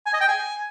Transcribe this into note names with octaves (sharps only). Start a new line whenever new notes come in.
G#5
D#5
G5
G#5